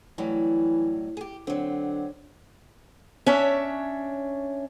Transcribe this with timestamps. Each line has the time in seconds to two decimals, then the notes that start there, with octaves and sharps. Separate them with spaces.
0.18 A2 E3 F#3 G3
1.17 G4 G#4
1.47 D3 F#3 C4
3.26 C#4 D4 C#5 E5